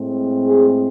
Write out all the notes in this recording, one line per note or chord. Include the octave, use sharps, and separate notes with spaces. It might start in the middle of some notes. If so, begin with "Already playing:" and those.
Already playing: A2 G#3 C4
G#4